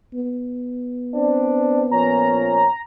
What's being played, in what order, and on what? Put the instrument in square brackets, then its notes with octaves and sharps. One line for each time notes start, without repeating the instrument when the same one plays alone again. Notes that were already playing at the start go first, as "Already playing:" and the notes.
[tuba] B3
[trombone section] C4 D4
[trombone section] A#2 F3 C#4 [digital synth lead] A#5